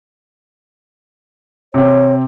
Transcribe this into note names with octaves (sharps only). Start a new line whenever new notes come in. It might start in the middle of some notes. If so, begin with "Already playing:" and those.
C3 C4 C#5